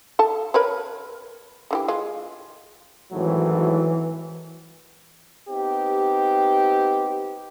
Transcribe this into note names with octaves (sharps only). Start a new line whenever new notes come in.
A4 A5
A#4 B4 C#5
D3 E3 G4
G#3 F4
G#1 A2 E3 F#3
B3 C4 D#4 G4